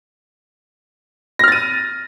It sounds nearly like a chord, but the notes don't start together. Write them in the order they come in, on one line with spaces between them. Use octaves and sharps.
A#6 F6 A6 D#7